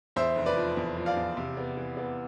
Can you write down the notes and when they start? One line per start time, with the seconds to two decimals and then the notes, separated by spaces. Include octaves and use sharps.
0.16 E2 C5 E5
0.36 F1
0.46 B4 D5
0.56 F3
0.77 E2
0.97 F3
1.06 D5 F5
1.17 E2
1.37 C3
1.57 B3
1.77 E3
1.97 B3